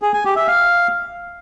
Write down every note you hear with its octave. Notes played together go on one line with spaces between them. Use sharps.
G#4
G#5
G4
E5
F5